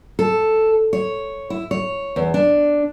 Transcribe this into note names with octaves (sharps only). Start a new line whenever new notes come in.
A4
C#5
E4
C#5
E2
D4